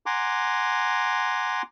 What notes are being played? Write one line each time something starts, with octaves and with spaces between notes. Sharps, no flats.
F#5 G#5 A#5 C6 D6